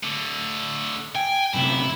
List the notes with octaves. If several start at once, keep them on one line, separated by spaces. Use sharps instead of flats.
A2 D3
G5 G#5
F#2 C3 E4